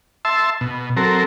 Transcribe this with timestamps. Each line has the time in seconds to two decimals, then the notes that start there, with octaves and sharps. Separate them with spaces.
0.25 E5 A5 C6 E6
0.61 B2
0.97 F#3 C4 A4 A#4